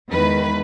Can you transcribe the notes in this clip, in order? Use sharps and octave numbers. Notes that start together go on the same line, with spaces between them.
E2 D#3 G#3 B4